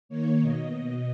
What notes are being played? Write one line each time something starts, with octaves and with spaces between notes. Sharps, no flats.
D#3 A#3 C#5
B2 D#5